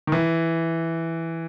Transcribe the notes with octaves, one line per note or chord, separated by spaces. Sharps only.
D#3
E3